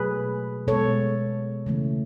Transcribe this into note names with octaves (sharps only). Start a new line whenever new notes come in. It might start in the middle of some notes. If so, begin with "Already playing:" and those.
Already playing: B2 F#3 A3 G#4 B4
B2 G#3 B3 A4 C#5
C#3 E3 A3